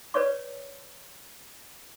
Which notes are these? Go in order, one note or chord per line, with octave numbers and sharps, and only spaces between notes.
B4 C#5 D5 C#6